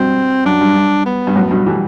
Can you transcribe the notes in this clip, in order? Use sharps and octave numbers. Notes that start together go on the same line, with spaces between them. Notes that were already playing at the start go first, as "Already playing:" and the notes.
Already playing: G2 B2 C4
F#2 D4
G2
G2
B3
G2
F#2 A2
G2 B2
E3 G3 A3